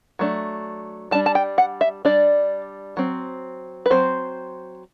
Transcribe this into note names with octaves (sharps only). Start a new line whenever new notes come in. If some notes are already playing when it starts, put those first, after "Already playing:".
F#3 A3 D4
G3 D4 A5
A5
G5
F#5
E5
G3 D4 D5
F#3 C4
B4
F#3 C4 C5